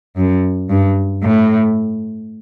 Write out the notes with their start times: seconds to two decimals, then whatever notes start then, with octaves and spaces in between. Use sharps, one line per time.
0.17 F#2
0.70 G2
1.23 A2